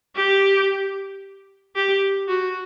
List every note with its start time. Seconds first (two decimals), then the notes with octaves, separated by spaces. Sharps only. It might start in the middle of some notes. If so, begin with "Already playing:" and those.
0.16 G4
1.76 G4
2.28 F#4